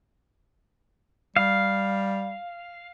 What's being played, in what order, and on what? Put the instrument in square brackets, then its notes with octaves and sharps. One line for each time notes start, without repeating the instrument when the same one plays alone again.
[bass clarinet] G3 [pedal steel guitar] F5